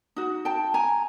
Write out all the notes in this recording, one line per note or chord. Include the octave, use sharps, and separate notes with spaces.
D#4 F#4
G5 A5
G#5 A#5